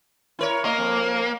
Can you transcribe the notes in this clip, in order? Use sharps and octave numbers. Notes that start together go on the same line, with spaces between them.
E4 A#4 C#5
A#3 D#5
F2